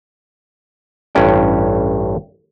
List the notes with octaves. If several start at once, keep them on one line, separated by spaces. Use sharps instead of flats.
A1 G2 C#4 G5